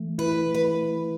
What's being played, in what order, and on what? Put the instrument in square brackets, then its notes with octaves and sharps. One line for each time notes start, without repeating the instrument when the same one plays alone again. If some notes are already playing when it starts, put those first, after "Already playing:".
Already playing: [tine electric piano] E3 A3
[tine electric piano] E4 [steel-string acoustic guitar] B4
[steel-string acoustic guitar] B4